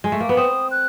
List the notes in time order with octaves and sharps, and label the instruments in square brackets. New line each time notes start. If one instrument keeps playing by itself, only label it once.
[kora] G#3
A3
A#3
B3
[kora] C4 [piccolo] D#6
[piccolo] F#6